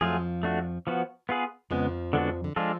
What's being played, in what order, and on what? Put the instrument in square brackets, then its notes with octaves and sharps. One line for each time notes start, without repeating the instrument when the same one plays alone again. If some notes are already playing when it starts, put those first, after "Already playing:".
[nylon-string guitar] F2 F3 [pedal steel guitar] F#3 A3 F4 G#4
[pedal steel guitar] A3 D4 F#4
F3 B3 F#4
B3 F4 G#4 B4
[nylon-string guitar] F2 F3 [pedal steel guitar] C#3 G#3 B3
[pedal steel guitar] D3 G#3 B3 D4 F#4
[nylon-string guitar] D3
[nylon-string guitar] F3 [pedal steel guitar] G#3 D4 F4 A4